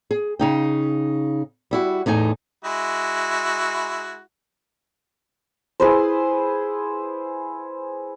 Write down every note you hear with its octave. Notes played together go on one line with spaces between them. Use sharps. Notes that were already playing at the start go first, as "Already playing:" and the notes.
G#4
C#3 D#4 G5
G3 E4 F#4
E2 A2 D#4 G#5
G#3 E4 F#4
E4 G#4 B4 C5